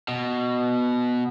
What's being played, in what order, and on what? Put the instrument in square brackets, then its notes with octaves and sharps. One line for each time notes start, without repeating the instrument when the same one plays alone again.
[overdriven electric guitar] B2